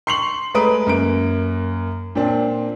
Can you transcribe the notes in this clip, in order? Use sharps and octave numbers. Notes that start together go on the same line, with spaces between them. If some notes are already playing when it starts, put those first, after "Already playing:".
C6 C#6 C7 F7 F#7
G#3 A3 B4 A#5 D#6 D7
F#2 A#3 D7
A#2 C4 D4